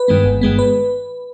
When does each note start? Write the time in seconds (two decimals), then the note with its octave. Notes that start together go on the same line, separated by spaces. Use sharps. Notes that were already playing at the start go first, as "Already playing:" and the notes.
Already playing: B4
0.08 G2 D#3 G#3 B3
0.25 G1
0.41 G2 D#3 G#3 B3
0.59 B4